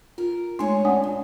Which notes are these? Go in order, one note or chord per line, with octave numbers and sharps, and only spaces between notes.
F4 A#4
G#3 A3 D4 G#4 C#5 G#5 C6
C#4 D4 F#5 G#5 D#6
A#2